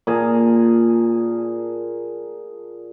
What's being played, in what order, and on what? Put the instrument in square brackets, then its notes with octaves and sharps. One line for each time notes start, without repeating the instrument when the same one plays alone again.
[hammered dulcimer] A#2 G#4 A5 A#5